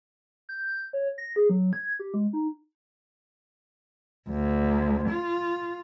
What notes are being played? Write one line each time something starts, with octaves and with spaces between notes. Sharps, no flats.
G6
C#5
A#6
G#4
F#3
G#6
G4
G#3
D#4
D2
F4